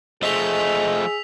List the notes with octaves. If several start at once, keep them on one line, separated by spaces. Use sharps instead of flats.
F3 A3 G#4 D#5 E6 B6 F7